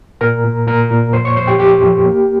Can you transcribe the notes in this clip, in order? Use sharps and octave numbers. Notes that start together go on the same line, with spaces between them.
A#2 A#4 A#5
A#2
A#2 A#4 A#5
A#2
F2 C5 C6
C#5 C#6
F2 C5 C6
G4 G5
F2 G4 G5
F2
A#3